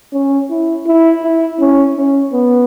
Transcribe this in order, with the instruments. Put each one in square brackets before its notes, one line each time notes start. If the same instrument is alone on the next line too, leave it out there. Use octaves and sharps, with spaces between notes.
[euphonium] C#4
E4
E4
E4
C#4
C#4
B3